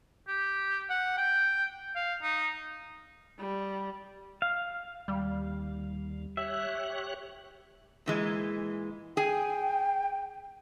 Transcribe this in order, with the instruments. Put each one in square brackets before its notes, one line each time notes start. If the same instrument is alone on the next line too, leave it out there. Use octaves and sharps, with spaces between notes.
[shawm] G4
F#5
G5
F5
D#4
[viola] G3
[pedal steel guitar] F5
[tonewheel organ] D#2 [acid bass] G3
[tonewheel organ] G4 C#5 F#6 [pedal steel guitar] E5
[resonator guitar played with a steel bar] A#2 E3 G#3
[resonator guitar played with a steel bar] G#4 G#5 [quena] G5